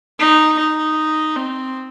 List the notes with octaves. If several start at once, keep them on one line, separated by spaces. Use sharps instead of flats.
D#4
D#4
C4